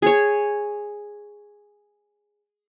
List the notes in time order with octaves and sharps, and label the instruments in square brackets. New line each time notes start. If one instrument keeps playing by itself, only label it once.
[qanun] G#4 C#5